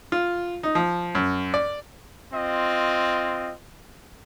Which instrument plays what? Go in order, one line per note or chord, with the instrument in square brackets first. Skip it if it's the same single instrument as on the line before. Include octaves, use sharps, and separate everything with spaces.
[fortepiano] F4
D#4
F3
F#2
D5
[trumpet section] C4 F4 D#5